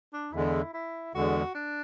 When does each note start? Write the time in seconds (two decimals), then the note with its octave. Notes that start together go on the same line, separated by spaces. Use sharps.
0.13 D4
0.33 E2 D3 G#3 E4
0.73 E4
1.14 E2 D3 G#3 F#4
1.55 D4